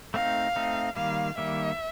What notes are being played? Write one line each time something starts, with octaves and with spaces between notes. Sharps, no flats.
A3 C4 D#4 F5
A3 C4 D#4
D#3 G3 A#3 F5
D#3 G3 A#3 E5